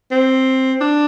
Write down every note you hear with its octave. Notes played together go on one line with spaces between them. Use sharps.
C4
D4